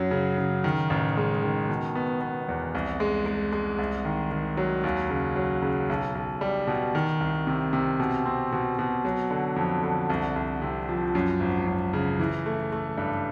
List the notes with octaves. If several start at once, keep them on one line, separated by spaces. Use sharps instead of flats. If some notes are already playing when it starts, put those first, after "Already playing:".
Already playing: F#2 F#3
C#3
C#3
D#3
A1
G#3
D#3
B2
B3
B3
E2
C2
G#3
G#3
G#3
C2
D#3
D#3
F#3
D#2
C#3
F#3
C#3
B1
B1
G3
B2
D#3
C2
C3
C3
B2
C4
B2
B2
F#3
D3
F2
D3
C2
C2
C3
F3
F#2
G#1
F#2
C#3
E3
A3
A3
G2